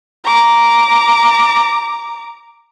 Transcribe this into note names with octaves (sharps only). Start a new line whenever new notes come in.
A#5 D6